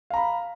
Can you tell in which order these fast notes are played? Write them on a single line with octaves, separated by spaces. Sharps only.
F5 A#5 B5